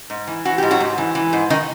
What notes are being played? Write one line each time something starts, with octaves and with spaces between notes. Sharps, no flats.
G#2
E3
E3 F#4
G#2 G4
F#3 F#4
G#2
E3
E3
G#2
D#3 D#4